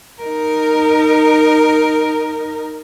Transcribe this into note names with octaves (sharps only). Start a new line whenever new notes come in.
D#4 A#4